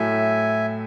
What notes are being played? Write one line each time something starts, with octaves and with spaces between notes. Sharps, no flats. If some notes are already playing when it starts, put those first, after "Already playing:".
Already playing: A2 F#3 A3 E5 G#5